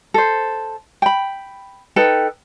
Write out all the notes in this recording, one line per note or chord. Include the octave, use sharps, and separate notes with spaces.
A4 C5
G5 B5
D#4 A4 B4 G5